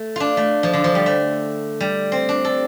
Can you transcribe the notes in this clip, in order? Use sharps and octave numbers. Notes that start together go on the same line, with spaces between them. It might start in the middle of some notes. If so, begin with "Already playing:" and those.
Already playing: A3
D4 F4
A3
F3
D3
F3
G3
A3
G3
C4
D4
A4